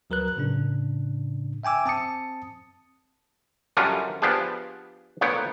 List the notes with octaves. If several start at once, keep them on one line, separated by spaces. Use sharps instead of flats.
D2 F#3 A#4 B4 F#6
A2 C#3 D4
E5 G5 G#5 D6 E6
C4 A5 D#6 C#7
F#2 D3 G3 C#4 D4 F4
F3 B3 D4 G4 G#4
D2 A#2 B3 C#5 G5